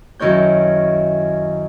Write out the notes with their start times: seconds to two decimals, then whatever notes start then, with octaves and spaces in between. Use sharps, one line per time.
0.19 F#2 D#3 E4 C#5 G6